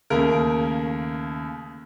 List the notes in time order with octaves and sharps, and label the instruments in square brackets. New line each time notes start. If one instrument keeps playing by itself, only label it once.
[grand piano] D#2 C#3 A3 A#4